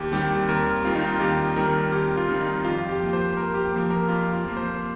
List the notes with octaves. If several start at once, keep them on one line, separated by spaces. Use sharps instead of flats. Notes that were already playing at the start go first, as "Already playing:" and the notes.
Already playing: D#2 G4
D#3 G3 C4 G4
D#2 A#4
D#3 G3 C4 F4
D#4
F4
D#2 G4
D#3 G3 C4 A#4
D#2 G4
F4
D#3 G3 C4
D#4
F2 F4
G4
F3 A#3
C5
F2 A#4
G4
F3 A#3
A#4
F2 F4
F4
F3 A#3
C5